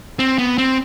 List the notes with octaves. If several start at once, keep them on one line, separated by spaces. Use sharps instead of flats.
C4
B3
C4